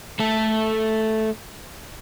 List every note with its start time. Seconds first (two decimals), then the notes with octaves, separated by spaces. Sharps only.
0.19 A3 A4